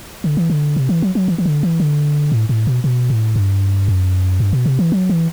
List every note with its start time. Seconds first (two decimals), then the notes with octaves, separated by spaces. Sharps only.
0.24 D3
0.37 E3
0.50 D3
0.76 C3
0.89 E3
1.02 F#3
1.15 F#3
1.28 E3
1.38 E3
1.45 D3
1.63 E3
1.80 D3
2.32 A2
2.49 A2
2.67 B2
2.84 B2
3.10 A2
3.36 G2
3.88 F#2
4.40 G2
4.53 B2
4.66 C3
4.79 E3
4.92 F#3
5.09 E3